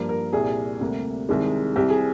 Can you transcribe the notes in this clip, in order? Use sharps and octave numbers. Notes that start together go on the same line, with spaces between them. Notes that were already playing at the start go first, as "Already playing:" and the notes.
Already playing: G2 F3 A#3
A#4
C2 A#2 G3 G#4
D2 C3 G3 A#3
C2 C3 D#3 G#3
C2 C3 G3 G4
G#4